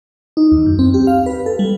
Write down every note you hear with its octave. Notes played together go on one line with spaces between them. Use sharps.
D#4
D#2
F#2
C4
G4
F5
B4
A4
G3